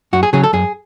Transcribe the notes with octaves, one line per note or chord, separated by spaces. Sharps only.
F#2 F#4
G#4
C#3 F#3 C#4 G#4
A4
F#2 G#4